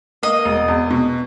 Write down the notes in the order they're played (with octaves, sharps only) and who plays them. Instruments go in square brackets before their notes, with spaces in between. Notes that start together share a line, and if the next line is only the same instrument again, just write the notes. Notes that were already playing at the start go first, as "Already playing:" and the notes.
[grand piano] A#3 [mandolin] D#5
[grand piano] E1
E2
B2